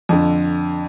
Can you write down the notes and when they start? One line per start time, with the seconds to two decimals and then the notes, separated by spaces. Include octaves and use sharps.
0.09 F2 D3